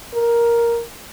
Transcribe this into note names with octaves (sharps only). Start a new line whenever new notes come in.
A#4